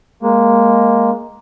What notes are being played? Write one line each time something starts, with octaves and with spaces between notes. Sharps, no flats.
G#3 A#3